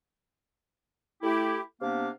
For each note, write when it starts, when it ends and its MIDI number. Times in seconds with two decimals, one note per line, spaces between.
1.22 1.58 57
1.22 1.58 64
1.22 1.58 67
1.81 2.09 48
1.81 2.09 58
1.81 2.09 59
1.81 2.09 62
1.81 2.09 77
1.81 2.09 86